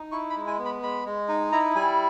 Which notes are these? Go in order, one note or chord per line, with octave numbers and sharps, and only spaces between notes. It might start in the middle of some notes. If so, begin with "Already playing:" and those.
Already playing: D#4
E4 C#6
B5
G#3
G#5
B3
B5
G#3 B5
G#3
D#4
E4 A#5
G3 G#5